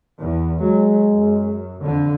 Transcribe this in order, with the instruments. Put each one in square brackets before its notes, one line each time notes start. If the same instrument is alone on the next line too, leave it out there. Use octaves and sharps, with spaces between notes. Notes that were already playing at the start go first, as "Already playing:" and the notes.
[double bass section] E2
[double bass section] F#3 [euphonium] G#3
[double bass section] F#2
F2 D3